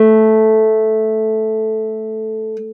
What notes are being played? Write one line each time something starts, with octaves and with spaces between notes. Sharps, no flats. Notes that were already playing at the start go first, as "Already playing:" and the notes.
Already playing: A3